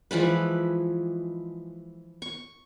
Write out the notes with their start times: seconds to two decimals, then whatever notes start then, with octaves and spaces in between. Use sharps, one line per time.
0.11 E3 F3 G#3 B4
2.22 C#6